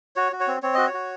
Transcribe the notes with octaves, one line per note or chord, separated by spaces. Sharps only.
F#4 C#5
F#4
C#5
C4
C4 C#5
F#4 D#5
C#5
F#4